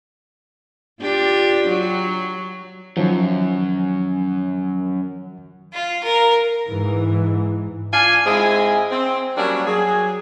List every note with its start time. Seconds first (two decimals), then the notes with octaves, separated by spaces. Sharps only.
1.01 D4 F4 G4
1.68 F#3
2.97 F#2 D#3 F3 F#3
5.73 F4
6.04 A#4
6.68 G#2 E3
7.93 D4 F4 G#5
8.25 G#2 G#3 C4 E4 G#5
8.91 C4
9.36 F#3 G3 A#3 C#4 D4
9.67 F#3 G#4